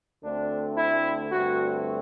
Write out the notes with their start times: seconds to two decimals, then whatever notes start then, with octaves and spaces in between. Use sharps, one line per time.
0.23 D2 D3 A3 C4 D4
0.77 E4
1.32 G2 D3 A3 C4 F#4